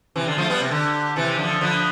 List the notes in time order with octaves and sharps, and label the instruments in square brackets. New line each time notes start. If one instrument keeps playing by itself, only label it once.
[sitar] C3 E3
[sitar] D3 [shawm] F4
[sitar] F3 A3
G3 B3
C3
[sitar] D3 [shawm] G4
[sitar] C3 E3 [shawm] A4
[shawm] G4
[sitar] D3 F3
[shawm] A4
[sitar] D3 F3 [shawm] B4